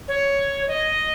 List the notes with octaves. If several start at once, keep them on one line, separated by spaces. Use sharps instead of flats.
C#5
D#5